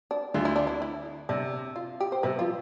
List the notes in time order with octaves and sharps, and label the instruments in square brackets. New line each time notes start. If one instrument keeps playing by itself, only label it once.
[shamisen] D4
[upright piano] D2 D3 [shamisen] F4
[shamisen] E4
D4
E4
E4
[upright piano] C3 [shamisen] D4
[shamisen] F4
G4
C5
[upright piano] C3 [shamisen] B4
[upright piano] F3 [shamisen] F4